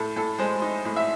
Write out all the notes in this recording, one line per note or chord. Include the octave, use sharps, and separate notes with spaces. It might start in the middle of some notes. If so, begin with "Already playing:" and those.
Already playing: A2 A4
A2 A4
G#3 C5
D#4
A2
E5